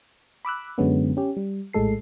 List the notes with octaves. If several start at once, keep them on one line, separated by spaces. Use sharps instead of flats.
B5 D6 E6 F#6
F#2 D3 F#3 G#3 B3 C#4
C#4 G4
G3
A#1 A2 G#3 A4 C7